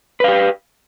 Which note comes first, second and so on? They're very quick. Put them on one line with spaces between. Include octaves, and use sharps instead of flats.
B4 F5 G4